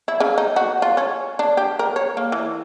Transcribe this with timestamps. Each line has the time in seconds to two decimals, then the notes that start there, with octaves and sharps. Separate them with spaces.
0.08 E4
0.20 C#3
0.38 D#4
0.56 F#4
0.82 F4
0.97 C#4
1.39 D4
1.57 G4
1.79 A#4
1.96 C#5
2.17 A#3
2.32 E3